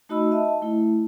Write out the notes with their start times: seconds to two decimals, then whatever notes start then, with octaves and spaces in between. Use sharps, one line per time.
0.09 A3 D#4 F#4 D#5 B5 E6
0.32 D#5 E5 A5
0.62 A3 E4